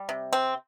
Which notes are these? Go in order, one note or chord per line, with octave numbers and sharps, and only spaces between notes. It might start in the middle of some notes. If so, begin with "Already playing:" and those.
Already playing: G3
C3
C4